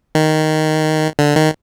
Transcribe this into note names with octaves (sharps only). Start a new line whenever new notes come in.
D#3
D3
D#3